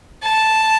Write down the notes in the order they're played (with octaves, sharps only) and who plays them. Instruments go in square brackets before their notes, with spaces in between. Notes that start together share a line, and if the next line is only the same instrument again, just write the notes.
[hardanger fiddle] A5